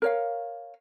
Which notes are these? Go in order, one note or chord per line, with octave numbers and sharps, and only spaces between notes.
A#4 C#5 F5